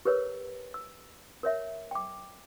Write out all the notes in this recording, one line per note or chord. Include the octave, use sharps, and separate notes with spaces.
G4 A#4 B4 C#5 E6
E6
A#4 C#5 E5
G5 D6